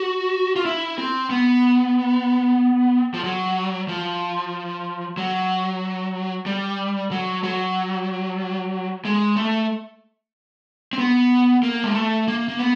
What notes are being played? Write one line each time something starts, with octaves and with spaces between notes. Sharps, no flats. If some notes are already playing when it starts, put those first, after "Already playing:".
Already playing: F#4
F4
E4
C4
B3
F3
F#3
F3
F#3
G3
F#3
F#3
G#3
A3
C4
B3
A#3
G#3
A3
A#3
A#3
B3